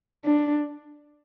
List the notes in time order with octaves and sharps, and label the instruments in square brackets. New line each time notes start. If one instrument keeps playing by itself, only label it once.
[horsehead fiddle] D4